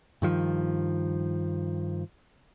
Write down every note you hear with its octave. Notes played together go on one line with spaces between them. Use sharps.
G2 D#3 F3